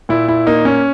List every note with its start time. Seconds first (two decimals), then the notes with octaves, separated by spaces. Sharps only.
0.09 A#2 E4
0.28 E4
0.47 A#3 D#4
0.65 C#4